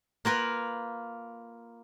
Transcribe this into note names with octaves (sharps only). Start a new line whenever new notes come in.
A#3 F4 A#4 B4